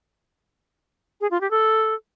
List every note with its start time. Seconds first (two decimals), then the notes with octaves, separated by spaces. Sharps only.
1.21 G#4
1.31 F4
1.41 G4
1.51 A4